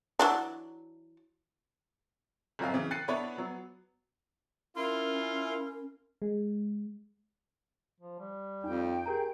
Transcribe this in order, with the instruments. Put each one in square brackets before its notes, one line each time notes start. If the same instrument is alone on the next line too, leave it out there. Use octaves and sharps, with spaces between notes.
[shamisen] E3 F#3 D4
[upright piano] G1 F#2 F#3 C4 D#5 F5
C#3 E3
G5 F#6 A6 C7 C#7 D#7
B3 D4 E4 B4 C#5 D5
F#3 B3
[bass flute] C#4 [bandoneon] E4 [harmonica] F4 [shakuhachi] A#4
[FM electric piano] G#3
[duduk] F3
G3
[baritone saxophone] F2 [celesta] D#4 [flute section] G5 G6
[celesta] G4 A#4 A#5 [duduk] G#4